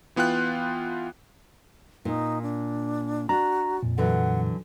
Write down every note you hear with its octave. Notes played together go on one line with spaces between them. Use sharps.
E3 B3 F4 G5 F#6
A#2 D#4
D4
D4 F#4 A#5
F2 A#2
D3 E3 F#3 F#5